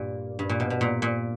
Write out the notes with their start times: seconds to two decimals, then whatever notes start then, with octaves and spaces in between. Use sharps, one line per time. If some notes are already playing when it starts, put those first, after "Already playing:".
Already playing: G2 A#2
0.39 G2
0.49 A#2
0.60 B2
0.70 B2
0.81 A#2
1.02 A#2